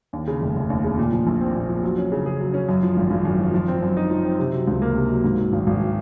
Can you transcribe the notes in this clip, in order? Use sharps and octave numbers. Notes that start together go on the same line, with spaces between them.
D#2
C#3
F1
F1
D#2
C#3
A#2
F3
A#1
C4
A#2
F3
F#3
C#4
C#3
G#4
F#3
C#4
F#2
F3
G#1
G#1
F#2
F3
F3
C4
F#2
D#4
F3
C4
C3
F#3
C#2
A#3
C3
F#3
G#2
F#3
G#1
G#1